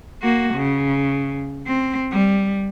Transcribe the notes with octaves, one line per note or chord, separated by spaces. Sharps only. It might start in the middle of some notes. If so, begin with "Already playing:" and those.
A#3 F#4
C#3
C4
G3